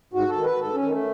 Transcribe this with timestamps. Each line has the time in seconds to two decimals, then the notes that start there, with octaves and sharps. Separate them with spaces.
0.13 G#2 F#4
0.29 A4
0.36 D#3
0.44 B4
0.60 G#2 A4
0.74 C#4
0.83 D#3
0.90 A3